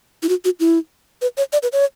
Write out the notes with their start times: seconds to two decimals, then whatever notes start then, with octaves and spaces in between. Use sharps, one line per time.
0.23 E4
0.29 F#4
0.45 F#4
0.60 E4
1.22 B4
1.37 C#5
1.53 D5
1.63 B4
1.73 C#5